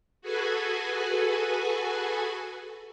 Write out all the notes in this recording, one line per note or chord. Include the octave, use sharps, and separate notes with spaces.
F#4 G#4 A4 B4 G#5